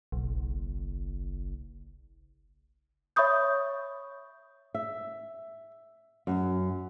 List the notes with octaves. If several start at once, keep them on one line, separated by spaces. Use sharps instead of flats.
F#1 B1
C#5 E5 B5 C#6 D#6 G6
E5
F#2